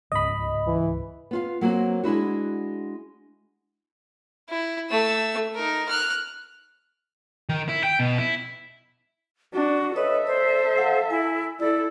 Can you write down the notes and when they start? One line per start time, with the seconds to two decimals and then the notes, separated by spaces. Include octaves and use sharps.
0.12 D1 C#2 G#2 D#5 B5
0.67 E3
1.31 B3 F4 F5
1.61 F#3 A#3 C4 F#4
2.04 G#3 D4 E4 F#4
4.49 E4
4.90 A3 E6
5.55 D#4 A#4
5.89 F6 F#6
7.49 D#3
7.69 E4
7.84 G5
7.99 B2
8.18 E4
9.53 D4 F#4
9.96 A4 B4 C#5 D#5 E5 D#6
10.27 C5 D5
10.78 F5 F#5
11.10 E4 G#5
11.60 E4 A4 D5 E6